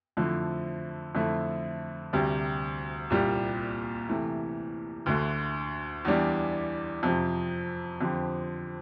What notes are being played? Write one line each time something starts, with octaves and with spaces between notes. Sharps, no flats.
F2 D3 F3 A3 E4
F2 D3 A3 E4
D2 C3 G3
C2 A#2 G3
C3 E3 A3
D2 D3 A3
E2 E3 G3 D4
F2 C3 F3
F2 D3 F3 C4 G4